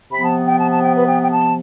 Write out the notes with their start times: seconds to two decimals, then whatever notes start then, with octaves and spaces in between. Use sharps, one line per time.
0.12 C3 F3 B3 B5
0.23 A5
0.47 G5
0.59 A5
0.71 A5
0.83 G5
0.95 B4
1.07 G5
1.23 G5
1.31 A5